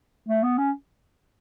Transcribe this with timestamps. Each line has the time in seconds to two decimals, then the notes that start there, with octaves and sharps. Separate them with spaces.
0.29 A3
0.43 B3
0.58 C#4